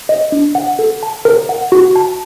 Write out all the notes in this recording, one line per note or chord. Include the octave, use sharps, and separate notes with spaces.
D#5
D4
F#5
A4
A5
A#4
F#5
F#4
A5